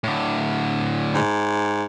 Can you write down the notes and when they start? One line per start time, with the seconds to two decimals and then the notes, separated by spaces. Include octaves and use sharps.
0.04 A2 D3
1.14 G#2